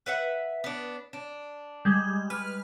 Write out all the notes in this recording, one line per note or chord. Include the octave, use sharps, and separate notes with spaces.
B4 E5 F#5
B3 D4
D4
G3 G#3
B4 F6